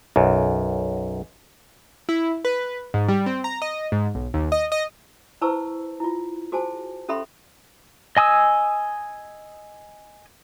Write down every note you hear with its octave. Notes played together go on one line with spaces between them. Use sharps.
B1 F#2
E4
B4
G#2
G3
C4
A#5
D#5
G#2
B1
D#2
D#5
D#5
E4 B4 C5 A5 C#6 E6
E4 F4
F#4 G#4 C5 G#5 A5
C#4 G4 A4 E5 B5 C6
D#5 G#5 D#6 E6